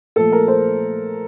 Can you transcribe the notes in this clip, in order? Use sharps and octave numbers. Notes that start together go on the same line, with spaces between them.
A#2 F3 A3 A4
A#4
C5